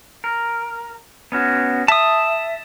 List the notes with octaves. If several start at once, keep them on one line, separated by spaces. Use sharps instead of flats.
A#4
B3 C#4 F#4
E5 A5 D#6